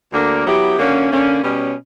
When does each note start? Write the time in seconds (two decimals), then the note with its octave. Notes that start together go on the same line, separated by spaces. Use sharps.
0.12 D2 D3 A#3 D4 A#4
0.45 F#3 B3 E4 G4
0.76 D3 A#3 C#4 F#4
1.10 D3 A#3 C#4
1.42 B2 G3 C#4